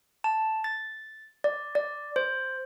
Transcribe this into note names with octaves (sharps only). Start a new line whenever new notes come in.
A5
A6
D5
D5
C5